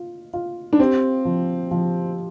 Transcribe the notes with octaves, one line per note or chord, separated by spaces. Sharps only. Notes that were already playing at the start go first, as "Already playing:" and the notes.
Already playing: F4
F4
D4
C4 G4
F3
F3